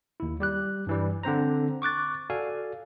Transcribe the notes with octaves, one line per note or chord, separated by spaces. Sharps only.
D#2 E4
G3 G4 F#6
G2 E3 G3
D3 C4 C5 A#5
C#6 D6 F#6 A6
F#4 A4 D5 F5 G#5